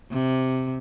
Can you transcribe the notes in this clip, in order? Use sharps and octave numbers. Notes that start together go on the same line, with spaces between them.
C3